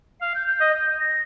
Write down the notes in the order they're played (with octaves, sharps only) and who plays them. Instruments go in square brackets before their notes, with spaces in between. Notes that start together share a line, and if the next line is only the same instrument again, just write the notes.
[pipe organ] F5
[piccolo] G6
G6
[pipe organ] D#5
[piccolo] A#6